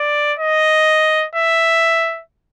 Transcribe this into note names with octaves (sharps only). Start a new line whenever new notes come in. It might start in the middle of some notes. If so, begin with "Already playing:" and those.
Already playing: D5
D#5
E5